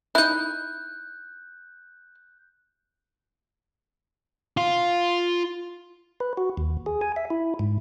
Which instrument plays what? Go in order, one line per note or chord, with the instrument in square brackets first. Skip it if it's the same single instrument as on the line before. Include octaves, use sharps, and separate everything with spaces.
[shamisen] D#4 E4 [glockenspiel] F#6 G6
[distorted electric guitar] F4
[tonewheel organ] B4
F#4
D#2
G#4
G#5
E5
E4
G#2